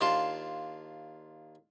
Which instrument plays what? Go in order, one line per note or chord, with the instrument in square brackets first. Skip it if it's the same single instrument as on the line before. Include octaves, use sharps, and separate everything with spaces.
[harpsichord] D#2 D4 F4 A5 C6